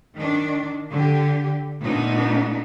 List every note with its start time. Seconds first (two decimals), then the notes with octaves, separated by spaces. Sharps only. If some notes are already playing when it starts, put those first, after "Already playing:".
0.15 D#3 D4
0.91 D3 G4
1.82 A#2 A3 B3 D4 D#4